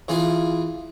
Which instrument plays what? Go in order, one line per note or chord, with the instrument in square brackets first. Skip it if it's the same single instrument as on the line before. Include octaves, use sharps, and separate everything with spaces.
[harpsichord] E3 F4 G#4